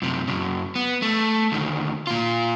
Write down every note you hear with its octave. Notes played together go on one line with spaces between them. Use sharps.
F#2 C3
F#2 C#3
B3
A3
D2 D#3
A#2 F4